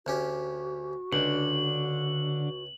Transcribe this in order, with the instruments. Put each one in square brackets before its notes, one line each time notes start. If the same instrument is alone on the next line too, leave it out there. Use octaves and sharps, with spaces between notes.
[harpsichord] D2 C#4 G4 [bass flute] F#4
[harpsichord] C#2 [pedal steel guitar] D3 D4 [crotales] F#7